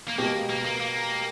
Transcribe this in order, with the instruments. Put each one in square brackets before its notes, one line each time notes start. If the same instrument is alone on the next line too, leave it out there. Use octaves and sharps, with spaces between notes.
[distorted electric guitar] A#3
[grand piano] B2 G#3 B3 G4 [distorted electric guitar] A#3
[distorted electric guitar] A#3
A#3
A#3